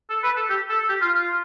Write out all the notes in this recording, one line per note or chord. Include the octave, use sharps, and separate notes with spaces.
A4
B4
A4
G4
A4
G4
F4
F4